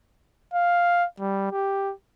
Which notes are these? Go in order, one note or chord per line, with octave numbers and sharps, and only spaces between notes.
F5
G3
G4